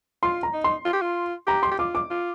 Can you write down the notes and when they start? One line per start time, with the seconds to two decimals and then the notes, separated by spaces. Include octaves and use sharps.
0.23 F4 C6
0.43 A#5
0.54 D#4
0.64 C6
0.85 F4
0.93 G4
1.02 F4
1.47 G4 A#5
1.63 C6
1.71 G4
1.79 F4 D6
1.95 D6
2.10 F4